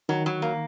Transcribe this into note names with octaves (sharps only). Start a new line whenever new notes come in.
D#3 F#3
F#3
A#3